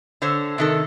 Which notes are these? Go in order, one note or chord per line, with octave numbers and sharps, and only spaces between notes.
D3 C5 C#5
C3 D#3 A4